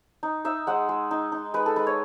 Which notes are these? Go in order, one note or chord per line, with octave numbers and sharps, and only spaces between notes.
D#4
D#4 E5
G#3 F#5
G#3
D#4
D#4
G#3 B4
A4
G#3 B4
C#5